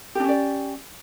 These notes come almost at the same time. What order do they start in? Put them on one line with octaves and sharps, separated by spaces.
G4 D4 C#4 D5